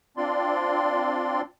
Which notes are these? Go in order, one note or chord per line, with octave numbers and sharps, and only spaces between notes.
C4 D4 F4 D5 C6